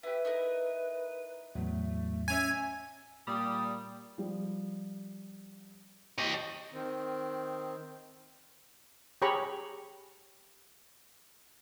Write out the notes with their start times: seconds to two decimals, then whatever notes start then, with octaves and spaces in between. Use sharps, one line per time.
0.03 E4 G4 B4
0.25 D#4 E4 A#4
1.55 E2 A2 F#3 A3
2.28 C#4 D#4 C#5 E5 G#5
3.27 A#2 G3 D#6
4.18 F3 G3
6.18 G4 D#5 C#6
6.73 D#3 C4
9.22 G4 G#4 C#5 A#5 B5 C#6